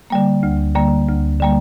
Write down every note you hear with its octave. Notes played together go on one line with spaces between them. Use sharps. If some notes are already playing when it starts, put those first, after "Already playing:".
D3 G3 A#3
D2
D3 G3 A#3
D2
D3 G3 A#3